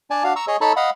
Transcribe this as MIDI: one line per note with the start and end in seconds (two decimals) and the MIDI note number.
0.10 0.23 62
0.10 0.23 74
0.10 0.23 80
0.10 0.23 81
0.24 0.33 62
0.24 0.33 66
0.24 0.33 77
0.36 0.45 82
0.36 0.45 85
0.36 0.45 88
0.48 0.57 68
0.48 0.57 73
0.48 0.57 75
0.61 0.73 63
0.61 0.73 69
0.61 0.73 73
0.61 0.73 81
0.61 0.73 83
0.76 0.90 75
0.76 0.90 77
0.76 0.90 78
0.76 0.90 83